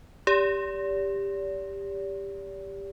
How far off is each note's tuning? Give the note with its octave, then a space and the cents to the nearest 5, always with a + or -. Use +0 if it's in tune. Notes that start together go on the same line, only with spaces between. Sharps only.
G4 +15 D5 -40